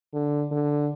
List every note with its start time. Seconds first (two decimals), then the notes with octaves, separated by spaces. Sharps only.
0.14 D3
0.52 D3